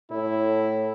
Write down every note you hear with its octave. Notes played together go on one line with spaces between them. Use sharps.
A2 E4